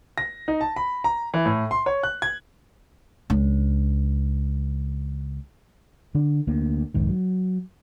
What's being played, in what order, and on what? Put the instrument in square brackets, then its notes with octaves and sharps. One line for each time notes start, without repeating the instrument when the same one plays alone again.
[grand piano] A#6
D#4
A5
B5
A#5
E3
A2
C6
C#5
F#6
G#6
[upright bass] C#2 D4
[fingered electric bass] D3 D4
D2 A#3
F1 C2 G#2 D#3
F#3